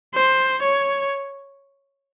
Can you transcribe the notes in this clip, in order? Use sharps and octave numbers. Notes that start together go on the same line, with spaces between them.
C5
C#5